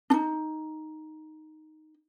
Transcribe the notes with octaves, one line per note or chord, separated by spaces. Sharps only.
D4 D#4